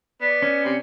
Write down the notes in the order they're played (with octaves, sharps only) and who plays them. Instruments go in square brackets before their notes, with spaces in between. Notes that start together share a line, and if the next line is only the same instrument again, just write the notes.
[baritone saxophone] B3 [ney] D5
[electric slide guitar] C#4
[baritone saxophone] C3